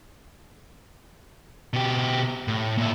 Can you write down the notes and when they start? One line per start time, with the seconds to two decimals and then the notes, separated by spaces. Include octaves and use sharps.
1.73 B2 G4
2.48 A2
2.78 A#2 E4